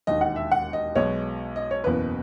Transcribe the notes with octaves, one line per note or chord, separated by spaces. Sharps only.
E1 D#2 D#3 D#5
F#5
E5
F#5
D#5
B1 B2 G#3 C#5
D#5
C#5
F#1 E2 B2 A#3 B4